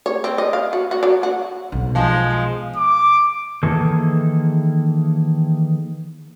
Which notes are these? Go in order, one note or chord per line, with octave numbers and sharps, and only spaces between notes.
C#5
C4
D#5
F5
F#4
F#4
F#3
F#4
B1
F3 G#3
D6
D#3 E3 A#3 G#4 A4